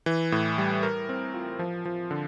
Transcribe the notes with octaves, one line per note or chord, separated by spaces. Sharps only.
E3
A2
G3
A#4
C4
F4
F3
F3
D3